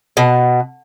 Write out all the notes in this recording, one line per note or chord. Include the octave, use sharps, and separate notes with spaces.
B2